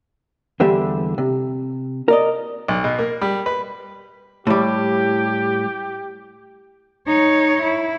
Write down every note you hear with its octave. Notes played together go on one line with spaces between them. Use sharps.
E2 D3 G3 G4 E5
C3
A#4 D5 D#5
B1
B2
A#3
G3
B4
A2 G3 G4
D#4 C#5
E4